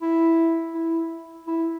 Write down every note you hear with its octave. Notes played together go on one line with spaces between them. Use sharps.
E4
E4
E4